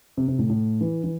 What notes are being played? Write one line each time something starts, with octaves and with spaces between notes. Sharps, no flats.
C3
C3
A2
A2
E3
E3